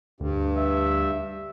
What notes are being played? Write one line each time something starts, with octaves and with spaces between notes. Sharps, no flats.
D2 G2
E5